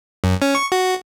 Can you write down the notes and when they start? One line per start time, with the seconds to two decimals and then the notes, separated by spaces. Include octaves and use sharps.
0.24 F#2
0.42 C#4
0.55 C#6
0.72 F#4